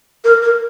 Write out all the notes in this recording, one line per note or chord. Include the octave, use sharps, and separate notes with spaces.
A#4
A#4